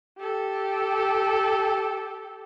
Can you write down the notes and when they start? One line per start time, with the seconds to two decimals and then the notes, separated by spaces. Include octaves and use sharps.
0.19 G4 A4